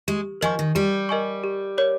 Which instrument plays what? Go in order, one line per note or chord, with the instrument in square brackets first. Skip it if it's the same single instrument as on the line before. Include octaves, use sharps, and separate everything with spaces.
[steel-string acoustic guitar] G#3 [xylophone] G4
[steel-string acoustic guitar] F3 [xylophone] A#4 D#5 G#5 C#6
[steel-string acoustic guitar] D#3
[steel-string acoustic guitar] G3 [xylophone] G4
[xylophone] A#4 D#5 G#5 C#6
G4
A#4 C#5